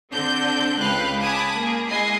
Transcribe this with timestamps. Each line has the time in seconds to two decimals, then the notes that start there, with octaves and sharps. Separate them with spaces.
0.12 D3 C4 D4 G6
0.79 C#2 B4 F5 G5 B5 F#6
1.21 G#5 A5 B5 D6 D#6
1.57 A#3 G#4
1.89 G#3 E4 D#5 G#5 C7